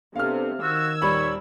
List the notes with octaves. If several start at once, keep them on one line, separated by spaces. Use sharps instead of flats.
C3 B3 D4 A4 F5 F6
D#3 F#4 E6 G#6
D#1 G3 C#5 B5